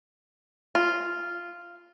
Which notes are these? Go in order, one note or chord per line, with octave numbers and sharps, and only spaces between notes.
F4